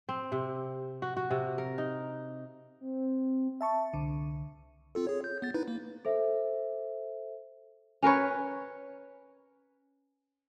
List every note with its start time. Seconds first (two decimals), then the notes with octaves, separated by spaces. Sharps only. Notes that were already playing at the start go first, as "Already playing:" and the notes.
0.09 C4
0.32 C3
1.02 F#4
1.17 F#4
1.31 C3
1.58 A#4
1.78 D#4
2.81 C4
3.61 E5 A5 C#6
3.94 C2 D3
4.95 C4 F4 A4
5.07 G#4 C#5
5.24 G6
5.42 B3 A6
5.54 D#4 E4 B4
5.68 A#3
6.05 A4 C5 E5
8.02 C#4 A#4 B4 C#5